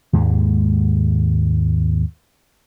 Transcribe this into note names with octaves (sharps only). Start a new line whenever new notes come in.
D#2 G#2 G#3